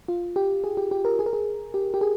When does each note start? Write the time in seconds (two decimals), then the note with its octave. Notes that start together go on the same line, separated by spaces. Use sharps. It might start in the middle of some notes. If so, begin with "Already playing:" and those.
0.08 F4
0.36 G4
0.64 G#4
0.77 G4
0.91 G4
1.05 A#4
1.19 G#4
1.26 A#4
1.33 G#4
1.74 G4
1.94 G4
2.01 G#4